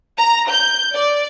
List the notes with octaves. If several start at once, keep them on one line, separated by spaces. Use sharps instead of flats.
A#5
G6
D5